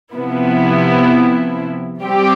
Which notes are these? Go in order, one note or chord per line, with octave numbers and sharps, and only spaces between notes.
C3 F3 B3 E4
G3 C4 G4